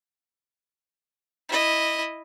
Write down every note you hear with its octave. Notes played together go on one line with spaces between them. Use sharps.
E4 D#5